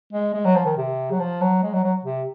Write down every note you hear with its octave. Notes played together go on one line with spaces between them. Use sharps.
G#3
G#3
F#3
F3
D#3
C3
F#3
F3
F#3
G#3
F#3
F#3
C3